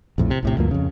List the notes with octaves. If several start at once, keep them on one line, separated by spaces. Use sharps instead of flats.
A#1 F2 A2
C3
A#1 A2 C3
D2 G2 F3 A#3
F2 C#3